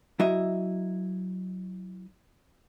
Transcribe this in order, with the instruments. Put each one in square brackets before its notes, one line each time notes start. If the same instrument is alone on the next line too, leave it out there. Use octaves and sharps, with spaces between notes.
[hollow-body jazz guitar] F#3 E4 D#5 E5